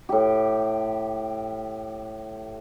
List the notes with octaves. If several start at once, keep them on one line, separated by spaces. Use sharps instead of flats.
A2 G4